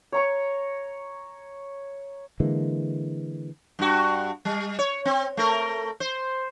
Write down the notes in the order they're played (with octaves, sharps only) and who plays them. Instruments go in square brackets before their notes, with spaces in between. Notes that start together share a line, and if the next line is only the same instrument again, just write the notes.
[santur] C#5 A#5 C#6
[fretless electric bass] D3 E3 G#3 A#3
[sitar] G2 F#4
G3
C#5
C4
A3 A#4
C5